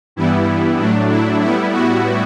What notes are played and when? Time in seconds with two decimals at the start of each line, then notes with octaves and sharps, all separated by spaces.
0.16 G2 E3 G3 B3 E4
0.79 A2 F#3 A3 D4
1.10 E4
1.40 A2 G3 B3 E4
1.72 F#4